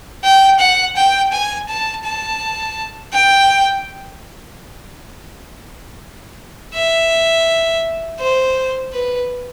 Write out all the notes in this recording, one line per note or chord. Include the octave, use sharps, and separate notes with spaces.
G5
F#5
G5
G#5
A5
A5
G5
E5
C5
B4